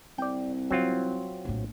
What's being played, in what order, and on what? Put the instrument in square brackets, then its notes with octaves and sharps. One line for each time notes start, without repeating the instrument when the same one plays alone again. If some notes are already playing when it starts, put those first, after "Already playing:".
[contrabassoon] C2 [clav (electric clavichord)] D5 G5
[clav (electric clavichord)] F#3 C4 F4 [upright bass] E4
[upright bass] A#1 A2